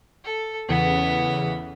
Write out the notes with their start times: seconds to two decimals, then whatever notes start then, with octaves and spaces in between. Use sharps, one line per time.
0.24 A4
0.68 E2 C#3 E3 B3 B5